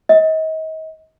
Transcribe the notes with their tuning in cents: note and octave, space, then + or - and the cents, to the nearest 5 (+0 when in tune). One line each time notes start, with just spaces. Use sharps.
D#5 +35